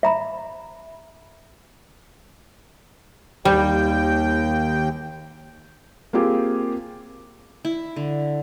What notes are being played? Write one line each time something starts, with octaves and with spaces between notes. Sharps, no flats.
E5 A#5 B5
D#2 G3 G5
A#3 C4 F4 G4 G#4
E4
D3